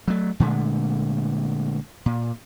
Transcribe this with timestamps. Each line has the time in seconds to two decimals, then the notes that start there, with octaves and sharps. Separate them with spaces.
0.08 F#3 A3
0.40 A#2 D3 G#3 A3
2.06 A#2